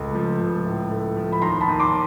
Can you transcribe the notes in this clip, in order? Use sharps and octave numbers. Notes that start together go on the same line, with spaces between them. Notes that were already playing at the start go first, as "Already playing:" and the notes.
Already playing: C#2 A3
F3
C#2
A2
A3
F3
B5
D#2 A#5 C6
A5 B5
D#2
C6 D6